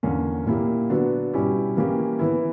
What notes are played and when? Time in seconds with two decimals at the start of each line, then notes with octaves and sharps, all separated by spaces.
0.03 E2 D3 A#3 C#4
0.46 A#2 A#3 E4 G4
0.90 D3 F#3 B3 D4 F#4
1.34 B2 G3 C#4 E4 G4
1.77 E3 A#3 C#4 E4 G4
2.19 E3 B3 E4